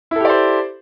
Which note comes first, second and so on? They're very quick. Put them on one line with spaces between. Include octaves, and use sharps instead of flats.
E4 A4 G4 D5 C5